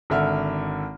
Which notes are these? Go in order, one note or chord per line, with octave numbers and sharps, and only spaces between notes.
G#1 D3 E5 F6